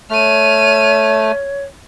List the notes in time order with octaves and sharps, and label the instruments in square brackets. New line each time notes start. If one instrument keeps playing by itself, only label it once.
[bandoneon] A3 [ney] C#5 [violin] F6 D#7